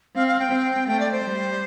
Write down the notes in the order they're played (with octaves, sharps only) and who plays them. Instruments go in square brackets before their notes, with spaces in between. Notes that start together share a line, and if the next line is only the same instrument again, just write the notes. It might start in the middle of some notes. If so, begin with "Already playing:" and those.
[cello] C4 [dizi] F5
[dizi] F5
G5
[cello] C4
[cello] A3 [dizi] G5
[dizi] D5
C5
[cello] G3